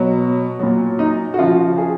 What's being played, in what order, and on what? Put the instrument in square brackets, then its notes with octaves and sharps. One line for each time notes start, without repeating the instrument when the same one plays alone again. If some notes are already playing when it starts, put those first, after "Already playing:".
Already playing: [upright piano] B2 F#3
A#2 F#3
D#4
F#4
C#3 F3 F4
G#4